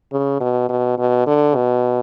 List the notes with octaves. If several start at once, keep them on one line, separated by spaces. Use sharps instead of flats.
C#3
B2
B2
B2
D3
B2